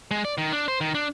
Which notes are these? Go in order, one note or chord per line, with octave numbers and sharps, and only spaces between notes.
G#3
D5
D#3
D4
C5
D#3
D4